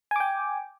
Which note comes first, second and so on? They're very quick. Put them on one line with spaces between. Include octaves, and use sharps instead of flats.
G#5 D6 G5